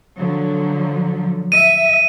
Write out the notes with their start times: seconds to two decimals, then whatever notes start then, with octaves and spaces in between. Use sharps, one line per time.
0.16 D3 F3 F#3
1.52 E5 D#7